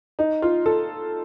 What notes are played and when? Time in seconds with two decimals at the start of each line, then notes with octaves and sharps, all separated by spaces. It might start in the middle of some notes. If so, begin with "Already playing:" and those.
0.19 D#4
0.42 F4
0.66 A4